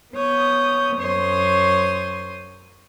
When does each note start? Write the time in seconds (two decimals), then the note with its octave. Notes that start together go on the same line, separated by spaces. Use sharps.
0.14 B3 C#5 D#6 G6
0.98 F#2 C5 C#5 C6 D#6